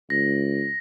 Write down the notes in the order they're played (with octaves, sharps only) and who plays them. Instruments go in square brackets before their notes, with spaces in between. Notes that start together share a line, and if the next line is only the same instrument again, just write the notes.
[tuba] C#2 [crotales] A#6